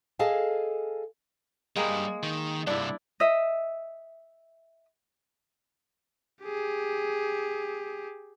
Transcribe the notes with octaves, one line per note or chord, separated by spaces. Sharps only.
G#4 A4 D#5 F5 G#5 A5
G2 G3 G#3 A#3 G#4
D#3
C2 G2 D4 E4
D#5 E5
G4 G#4